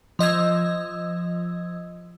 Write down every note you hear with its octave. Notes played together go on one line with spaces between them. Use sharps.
F3 D#5 E6 G#6